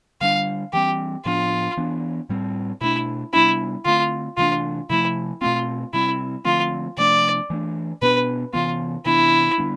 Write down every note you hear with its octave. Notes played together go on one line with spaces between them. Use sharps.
D3 G3 D4 F5
E3 G3 C4 G4
A2 F3 B3 D4 F4
E3 B3 D4
A2 G3 C4
B2 A3 D4 E4
C3 G3 B3 D4 E4
D3 A3 C4 F4
C3 E3 A3 D4 F4
C3 F3 A3 E4
B2 A3 C4 F4
C3 G3 C4 E4
D3 F3 A3 C4 F4
C3 F3 A3 D4 D5
E3 A3 D4
B2 B3 D4 B4
C3 E3 B3 F4
C3 E3 B3 D4 E4
D3 G3 B3 D4